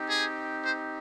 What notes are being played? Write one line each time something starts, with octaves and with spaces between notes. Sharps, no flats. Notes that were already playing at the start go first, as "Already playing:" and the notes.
Already playing: C4 D#4 G4
G#4
C5